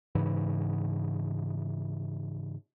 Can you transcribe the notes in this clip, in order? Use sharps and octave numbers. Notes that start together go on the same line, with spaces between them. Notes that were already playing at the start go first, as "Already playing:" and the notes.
G#2 C#3 E3